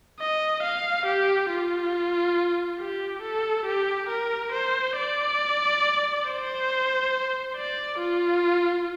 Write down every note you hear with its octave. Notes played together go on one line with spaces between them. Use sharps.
D#5
F5
G4
F4
G4
A4
G4
A#4
C5
D5
C5
D5
F4